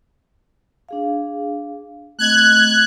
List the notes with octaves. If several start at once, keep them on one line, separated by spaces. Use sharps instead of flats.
D4 G#4 F5
A3 C4 D#5 F#6 G#6